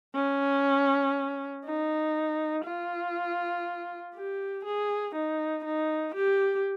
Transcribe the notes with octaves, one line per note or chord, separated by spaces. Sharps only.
C#4
D#4
F4
G4
G#4
D#4
D#4
G4